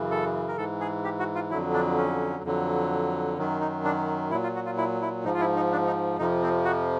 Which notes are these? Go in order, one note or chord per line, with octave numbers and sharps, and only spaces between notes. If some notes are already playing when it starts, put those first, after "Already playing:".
Already playing: F#2 C#3 E3
A4
A#4
G#2 E3 A4
G#4
G4
F#4
F4
F2 D3 F#3 E4
D4
C#4
F2 D3 F#3
F#2 D#3 F#3
D#4
D4
A#2 F#3 E4
F4
F#4
F4
E4
E4
G#2 F3 D#4
F4
E4
D#4
D4
D#4
F2 C3 F3 D#4
C4
F#4